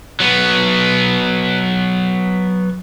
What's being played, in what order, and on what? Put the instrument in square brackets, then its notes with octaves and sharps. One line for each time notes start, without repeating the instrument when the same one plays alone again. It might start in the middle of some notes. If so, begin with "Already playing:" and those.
[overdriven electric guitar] F#3 B3